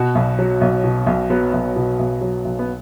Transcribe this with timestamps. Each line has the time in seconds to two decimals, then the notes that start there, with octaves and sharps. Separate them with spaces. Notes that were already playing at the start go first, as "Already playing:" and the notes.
Already playing: B2 F#4
0.15 B1
0.39 F#3
0.61 B1
0.84 B2
1.07 B1
1.30 F#3 B3
1.54 B1
1.76 B2
1.99 B1
2.21 F#3
2.45 B1
2.59 B3